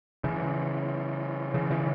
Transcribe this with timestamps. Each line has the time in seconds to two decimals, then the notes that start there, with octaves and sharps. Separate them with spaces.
0.24 C#3 E3
1.54 C#3 E3
1.71 C#3 E3